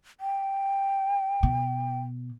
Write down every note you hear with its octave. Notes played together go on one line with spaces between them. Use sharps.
G5
B2